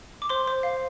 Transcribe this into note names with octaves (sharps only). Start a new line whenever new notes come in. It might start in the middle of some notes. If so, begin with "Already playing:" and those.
D6
C5 C6
C5
F5